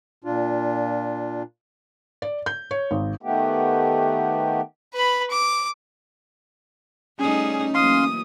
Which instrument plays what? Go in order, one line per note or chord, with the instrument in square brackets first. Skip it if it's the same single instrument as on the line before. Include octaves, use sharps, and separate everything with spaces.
[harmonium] A#2 D4 F4
[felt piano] D5
G6
C#5
G#1
[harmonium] D#3 A3 B3 G4
[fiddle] B4 B5
D6
[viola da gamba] G3 A3 D#4 [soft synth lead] C#4 [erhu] G#4
[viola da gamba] E3 F#3 A#3 [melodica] F5 C6 [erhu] D#6